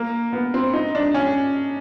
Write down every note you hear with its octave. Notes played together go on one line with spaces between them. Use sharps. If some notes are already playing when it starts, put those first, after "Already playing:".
Already playing: A#3
B3
C4
D#4
D4
C#4